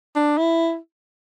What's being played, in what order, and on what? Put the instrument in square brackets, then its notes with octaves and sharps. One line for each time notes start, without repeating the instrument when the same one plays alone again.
[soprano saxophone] D4
E4